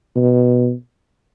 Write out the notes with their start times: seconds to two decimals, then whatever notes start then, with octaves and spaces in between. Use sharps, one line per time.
0.16 B2